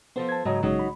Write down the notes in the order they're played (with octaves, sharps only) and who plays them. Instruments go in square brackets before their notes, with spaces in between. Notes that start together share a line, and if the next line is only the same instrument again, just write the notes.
[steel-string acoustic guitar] F3 A4 C5 [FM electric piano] B3
[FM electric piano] A5 G#6
[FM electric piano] G#2 D#5 A#5 [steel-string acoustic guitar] C#3 F#3
[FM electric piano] A#1 C#3 G#3 [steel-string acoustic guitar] F#3 D#4
[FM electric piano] B5